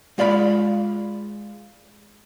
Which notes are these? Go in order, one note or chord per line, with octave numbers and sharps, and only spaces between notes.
G#3 F4 D5 F5 B5